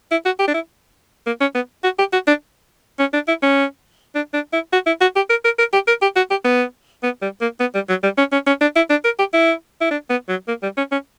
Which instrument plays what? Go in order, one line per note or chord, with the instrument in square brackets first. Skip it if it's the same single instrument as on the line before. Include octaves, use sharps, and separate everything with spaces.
[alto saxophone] E4
F#4
G4
D4
E4
A#3
C#4
B3
F#4
G4
F#4
D4
C#4
D4
E4
C#4
D4
D4
E4
F#4
E4
F#4
G4
A#4
A#4
A#4
G4
A#4
G4
F#4
G4
B3
B3
G3
A#3
B3
G3
F#3
G3
C#4
C#4
C#4
D4
E4
D4
A#4
G4
E4
E4
D4
B3
F#3
A#3
G3
C#4
C#4